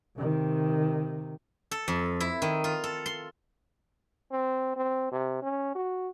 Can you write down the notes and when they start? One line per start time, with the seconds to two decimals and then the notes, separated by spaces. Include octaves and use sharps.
0.17 C3 D#3
1.71 A4
1.88 F2
2.20 E4
2.42 D#3
2.64 F4
2.84 A4
3.06 C6
4.32 C4
4.77 C4
5.12 C3
5.42 C#4
5.75 F#4